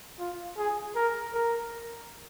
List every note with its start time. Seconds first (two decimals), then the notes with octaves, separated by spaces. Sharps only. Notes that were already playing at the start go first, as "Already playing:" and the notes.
0.19 F4
0.57 G#4
0.95 A#4
1.34 A#4